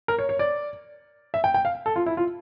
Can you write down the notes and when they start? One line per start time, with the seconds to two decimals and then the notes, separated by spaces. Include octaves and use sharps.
0.08 A#4
0.19 C#5
0.29 C#5
0.39 D5
1.34 E5
1.44 G5
1.54 G5
1.65 F5
1.86 A4
1.96 F4
2.06 E4
2.17 F4